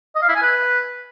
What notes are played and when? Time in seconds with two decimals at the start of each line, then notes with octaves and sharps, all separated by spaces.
0.16 D#5
0.22 F5
0.29 E4
0.36 G#5
0.42 B4